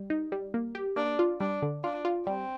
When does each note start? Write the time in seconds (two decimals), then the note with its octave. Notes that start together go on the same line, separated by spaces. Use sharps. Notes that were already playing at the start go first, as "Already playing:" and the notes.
Already playing: G3
0.10 D#4
0.32 G3
0.54 A#3
0.75 G4
0.96 A#3 D4
1.19 F4
1.40 G3 D4
1.62 D3
1.84 D4 F4
2.05 F4
2.27 G3 C4